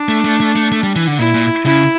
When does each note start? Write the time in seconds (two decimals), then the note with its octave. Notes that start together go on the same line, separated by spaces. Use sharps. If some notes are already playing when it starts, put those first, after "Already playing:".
Already playing: D4
0.09 A3
0.25 A3
0.40 A3
0.56 A3
0.72 A3
0.83 G3
0.96 E3
1.07 D3
1.19 A#2 E4
1.34 A#2
1.66 C#3 E4